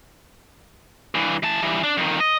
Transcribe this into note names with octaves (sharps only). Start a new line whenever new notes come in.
G2 E3
E3 A5
E3 G3
D4
F2 D#3
D#5